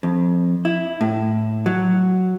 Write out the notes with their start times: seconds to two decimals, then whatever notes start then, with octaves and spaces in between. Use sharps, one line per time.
0.03 F2
0.65 E4
1.01 A2
1.66 F#3